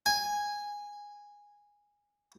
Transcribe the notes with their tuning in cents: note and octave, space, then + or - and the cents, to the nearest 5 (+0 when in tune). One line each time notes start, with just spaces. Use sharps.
G#5 -10